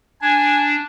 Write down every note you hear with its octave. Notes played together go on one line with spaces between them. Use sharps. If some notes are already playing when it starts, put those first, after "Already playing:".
D4 G#5